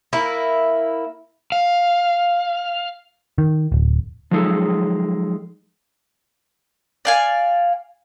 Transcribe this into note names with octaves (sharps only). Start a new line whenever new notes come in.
A#3 E4
F5
D#3
D1
F3 F#3 G#3 D#4 G#4 A4
D5 F5 G#5